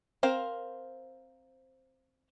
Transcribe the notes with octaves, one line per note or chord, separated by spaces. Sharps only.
C4 A#4 C5 F5